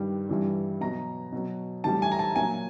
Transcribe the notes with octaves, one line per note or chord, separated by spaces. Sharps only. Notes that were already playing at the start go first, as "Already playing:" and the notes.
Already playing: G2 D#3 G3
G2 E3 G3
B2 F#3 A#5
B2 F#3
A2 E3 G3 A5
G#5
A#5
A5
A#2 F#3 G#5